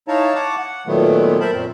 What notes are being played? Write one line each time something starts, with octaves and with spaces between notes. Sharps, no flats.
D#4 E4 C#5 F5 A5 A#5
C#5 F#5 A5 D6
F#5
A#2 D#3 F#3 A3 B3
A#4 C5 E5 A5 B5
F#2 A#2 C4